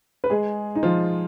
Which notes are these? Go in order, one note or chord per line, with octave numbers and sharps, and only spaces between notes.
B4
G#3 G#4
D#4
F3 F4